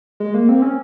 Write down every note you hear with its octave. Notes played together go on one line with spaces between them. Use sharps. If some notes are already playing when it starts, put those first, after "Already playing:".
G#3
A#3
C4
C#4